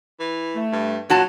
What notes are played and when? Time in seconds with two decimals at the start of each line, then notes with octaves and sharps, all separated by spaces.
0.20 E3
0.55 A3
0.72 G2
1.10 A#2 F#3 C#4 F4 F#4 A5